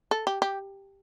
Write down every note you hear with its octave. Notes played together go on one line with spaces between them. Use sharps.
A4
G4
G4